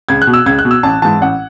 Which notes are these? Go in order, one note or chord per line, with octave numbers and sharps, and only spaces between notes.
C#2 G#6
F#6
B2
E6
C#2 G#6
F#6
B2
E6
A1 A5
G#2 E3 A5
A1 F#5